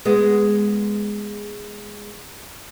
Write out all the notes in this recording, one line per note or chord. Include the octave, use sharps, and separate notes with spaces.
G#3 B3